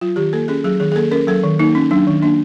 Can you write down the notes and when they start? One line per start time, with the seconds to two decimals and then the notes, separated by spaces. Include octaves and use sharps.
0.01 F#3 F4
0.16 D#3 G4
0.33 A#3 A4
0.48 C#4 G#4
0.64 F#3 G#4
0.80 D#3 G#4
0.92 G#4
0.96 A#3 A4
1.11 C#4 A#4
1.27 F#3 A4
1.44 D#3
1.59 A#3 D#4
1.75 C#4
1.91 F#3 D4
2.07 D#3
2.22 A#3 D4